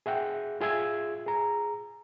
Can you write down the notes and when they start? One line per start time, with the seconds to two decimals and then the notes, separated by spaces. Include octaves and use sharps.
0.06 G#4 E5 F#5 G5
0.61 F4 G#4 E5 E6 G#6
1.26 G#4 A#5